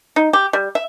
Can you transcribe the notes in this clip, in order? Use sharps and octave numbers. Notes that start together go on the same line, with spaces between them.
D#4
G4
G3
E5